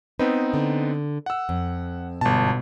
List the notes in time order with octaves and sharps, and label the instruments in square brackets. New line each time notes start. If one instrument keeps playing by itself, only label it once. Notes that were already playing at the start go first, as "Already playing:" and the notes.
[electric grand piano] B3 C4 D#4 [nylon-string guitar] B4
[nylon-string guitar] D3
[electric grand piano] F#5 E6
[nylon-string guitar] F2
[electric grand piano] G1 A5 [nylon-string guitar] G#2 B2